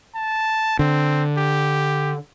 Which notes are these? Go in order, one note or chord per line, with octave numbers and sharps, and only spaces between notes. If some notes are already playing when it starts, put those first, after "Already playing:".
A5
D3 C4
G4